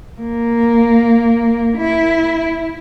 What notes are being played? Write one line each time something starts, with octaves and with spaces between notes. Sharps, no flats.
A#3
E4